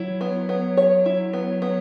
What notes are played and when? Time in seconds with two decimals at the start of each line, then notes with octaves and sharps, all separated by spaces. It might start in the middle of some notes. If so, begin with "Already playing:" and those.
Already playing: F#3 E4
0.21 B3
0.49 B3
0.77 C#5
1.06 E4
1.33 B3
1.62 B3